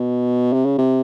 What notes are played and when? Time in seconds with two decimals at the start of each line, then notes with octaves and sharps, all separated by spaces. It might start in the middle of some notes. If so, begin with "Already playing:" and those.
Already playing: B2
0.53 C3
0.65 C#3
0.78 C3